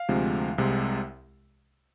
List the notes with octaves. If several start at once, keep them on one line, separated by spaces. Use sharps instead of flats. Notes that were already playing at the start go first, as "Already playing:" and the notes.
Already playing: F5
D2 C3 F3 G#3
C2 C3 G#3